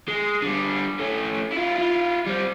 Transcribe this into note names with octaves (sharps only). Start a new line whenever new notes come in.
G#3
D3 G3
A3 C#4
E4 F4
E4 F4
G3 C4